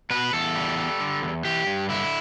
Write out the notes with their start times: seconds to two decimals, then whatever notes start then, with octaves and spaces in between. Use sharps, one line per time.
0.10 B2 B4
0.33 E2 A4
0.55 G3
0.78 G3
1.00 D3
1.22 E2
1.45 E3 G4
1.67 G2
1.89 D3 E4